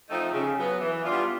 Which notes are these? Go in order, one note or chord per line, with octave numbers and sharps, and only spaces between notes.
F3 A3 C4 D#4
C#3
F#3 B3
E3
G3 B3 D4 F4